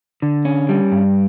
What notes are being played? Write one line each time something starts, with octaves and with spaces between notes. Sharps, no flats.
D3
C#4
G3
G2